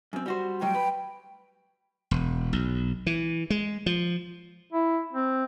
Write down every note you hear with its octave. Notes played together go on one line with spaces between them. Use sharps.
F#2 C4
G3 F#4 C5
A2 F#3 G3 G5
B4
E1
B1
E3
G#3
F3
E4
C4